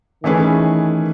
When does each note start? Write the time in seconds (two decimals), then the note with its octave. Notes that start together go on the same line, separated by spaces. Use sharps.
0.23 D#3 E3 A3 C#4 G#4 B4